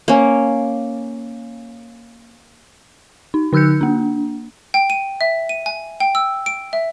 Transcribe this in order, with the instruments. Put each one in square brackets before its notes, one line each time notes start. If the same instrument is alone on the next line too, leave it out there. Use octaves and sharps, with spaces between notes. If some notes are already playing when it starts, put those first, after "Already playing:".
[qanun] A#3 C#4
[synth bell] D#4
D3 D#4 E6 F#6 G6 C#7
A#3 D4
[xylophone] G5
D#7
E5
D#7
G#5
G5
E6
D7
E5